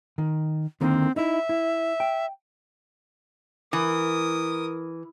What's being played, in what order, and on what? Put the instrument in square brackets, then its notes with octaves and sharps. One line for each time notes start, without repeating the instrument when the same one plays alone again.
[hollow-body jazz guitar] D#3
[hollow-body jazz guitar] D3 D#3 A#3 [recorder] C4
[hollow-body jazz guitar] D#4 E4 [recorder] E5
[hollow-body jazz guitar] E4
G5
[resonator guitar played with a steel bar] E3 [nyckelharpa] A#4 D#6